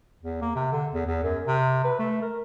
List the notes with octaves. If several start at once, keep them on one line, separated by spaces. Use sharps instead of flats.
E2
A#3
C3
D3
E2
E2
F#2
C3
B4
A3
A#4